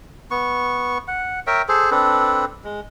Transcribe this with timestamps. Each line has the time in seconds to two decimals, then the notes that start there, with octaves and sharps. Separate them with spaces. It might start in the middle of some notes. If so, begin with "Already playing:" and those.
0.31 B3 C#6
1.08 F#5
1.47 A#4 C#5 E5 G5
1.68 G#4 A4 C5
1.91 C4 D4 A4 B4
2.64 G#3